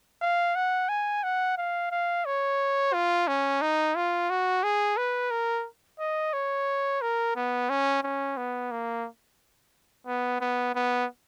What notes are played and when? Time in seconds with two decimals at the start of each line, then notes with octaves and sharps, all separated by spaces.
0.22 F5
0.56 F#5
0.89 G#5
1.23 F#5
1.58 F5
1.91 F5
2.26 C#5
2.94 F4
3.28 C#4
3.62 D#4
3.95 F4
4.30 F#4
4.63 G#4
4.97 B4
5.31 A#4
5.99 D#5
6.33 C#5
7.02 A#4
7.36 B3
7.70 C#4
8.03 C#4
8.38 B3
8.72 A#3
10.07 B3
10.41 B3
10.75 B3